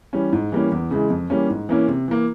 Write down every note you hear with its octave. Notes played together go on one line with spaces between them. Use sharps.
E3 G3 C#4
G#2
E3 G3 A#3 C#4
E2
C#3 E3 G#3
F2
E3 G3 A#3 C#4
G#2
E3 A#3 C#4 E4
C3
E3 A#3